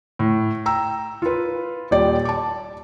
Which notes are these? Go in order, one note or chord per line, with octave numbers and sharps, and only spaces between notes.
A2
G5 A#5 E6
F4 B4
D#1 G4 D5
A5 D6